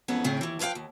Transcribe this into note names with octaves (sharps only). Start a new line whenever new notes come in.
F2 G#2 E3 B3 C#4
A2 C#3 C4
D#2 E3
F3 B4 C5 F5 G5
D#2